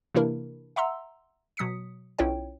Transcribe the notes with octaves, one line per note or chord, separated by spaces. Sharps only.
C3 E3 A#3 D4 E4 A#4
E5 F#5 A#5 C6 E6
B2 F#3 D#6 B6 C#7
B1 C#4 E4 F4 C#5 G5